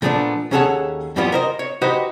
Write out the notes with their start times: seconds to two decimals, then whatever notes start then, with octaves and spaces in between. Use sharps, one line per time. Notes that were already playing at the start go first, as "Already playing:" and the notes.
0.02 A#2 F3 A3 B3 C#4 D4
0.51 D#2 C#4 G#4 A4 C#5 F#5
1.16 F#2 B2 E3 G3 B3 F4
1.32 A#4 C5 D#5
1.59 C#5
1.82 D#4 F#4 G4 B4 C5 D#5